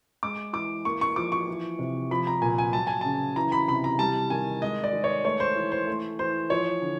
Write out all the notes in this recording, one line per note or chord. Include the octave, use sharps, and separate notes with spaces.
G#3 D6
E3 D6
A#3 C#6
C#6
F3 D6
C#6
E3
C3
F3 B5
A#5
A#2 G#5
G#5
F#3 A5
G#5
C#3 A5
E3 A#5
B5
C3 B5
A#5
G3 A5
D#3 G#5
G#3 D#5
D5
D#3
C#5
A3 C#5
C5
E3
C5
A3
E3 C5
F3 C#5
D3